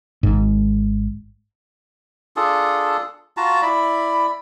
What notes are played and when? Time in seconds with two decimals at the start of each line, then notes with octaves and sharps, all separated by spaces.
0.23 G#1 G#2
2.36 D4 F4 G#4 A4
3.37 F4 F#4 A5 A#5
3.62 E4 D5 B5